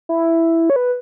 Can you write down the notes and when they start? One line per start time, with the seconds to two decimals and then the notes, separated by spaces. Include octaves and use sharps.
0.09 E4
0.70 C#5
0.76 B4